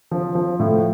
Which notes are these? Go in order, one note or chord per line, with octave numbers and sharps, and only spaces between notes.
F3
F3
A2